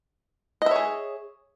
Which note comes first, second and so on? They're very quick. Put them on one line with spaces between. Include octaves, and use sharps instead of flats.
D#5 E5 C#5 G#4